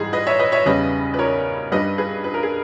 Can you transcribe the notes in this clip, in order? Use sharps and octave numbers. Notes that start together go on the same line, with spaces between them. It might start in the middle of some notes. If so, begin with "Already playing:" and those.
Already playing: G#2 E3 G3 G#4
B4 D#5
C#5 E5
B4 D#5
C#5 E5
E2 C#3 G3 B4 D#5
B4
A#4 C#5
G2 G3 B4 D#5
G#4 B4
B4
A#4
G#4